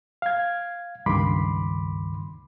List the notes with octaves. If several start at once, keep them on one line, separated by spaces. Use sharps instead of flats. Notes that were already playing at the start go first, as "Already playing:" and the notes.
F5 G#6
C#2 G2 D#3 B5 C6 D6